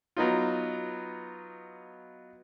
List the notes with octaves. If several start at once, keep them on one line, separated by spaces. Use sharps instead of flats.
F#3 B3 D#4 F4